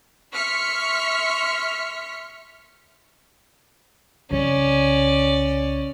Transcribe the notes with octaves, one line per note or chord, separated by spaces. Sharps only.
E5 C6 C#6 F6 B6 C#7
C2 C#3 C#4 D5